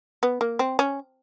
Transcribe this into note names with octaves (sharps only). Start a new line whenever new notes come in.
B3
A#3
C4
C#4